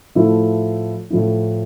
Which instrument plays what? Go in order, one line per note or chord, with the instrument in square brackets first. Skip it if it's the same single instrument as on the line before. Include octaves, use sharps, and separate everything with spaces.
[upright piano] A2 F3 A3 E4
A2 F3 A3 E4